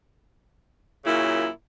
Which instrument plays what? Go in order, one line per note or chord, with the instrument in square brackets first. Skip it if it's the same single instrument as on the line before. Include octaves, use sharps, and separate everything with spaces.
[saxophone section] F#2 A#2 C#3 E4